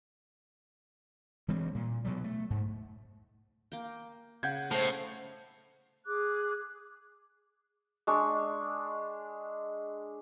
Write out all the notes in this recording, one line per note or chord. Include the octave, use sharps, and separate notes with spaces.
E3 G3 G#3 C4
A#2
B2 F#3 G3
A3
G#2
A#3 G5
C#3 F#5 G6 G#6
A2 C5
G#4 D6 F#6
G#3 D4 C#6